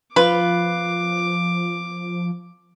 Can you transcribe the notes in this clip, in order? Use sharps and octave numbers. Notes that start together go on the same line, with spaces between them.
F3 F4 B4 D6